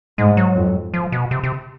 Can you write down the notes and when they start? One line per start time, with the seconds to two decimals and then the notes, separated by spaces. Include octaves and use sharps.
0.18 G#2 G#3
0.37 F#3
0.56 F2
0.94 F3
1.12 B2
1.31 C3
1.43 C3